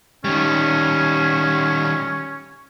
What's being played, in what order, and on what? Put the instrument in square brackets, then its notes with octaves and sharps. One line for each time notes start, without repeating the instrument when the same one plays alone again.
[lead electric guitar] D#3 G3 [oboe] C#4